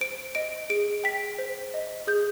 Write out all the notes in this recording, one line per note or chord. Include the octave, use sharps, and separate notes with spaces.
C5 D7
D#5 D7
G#4 D7
G5 B6
C5
D#5
G#4 G6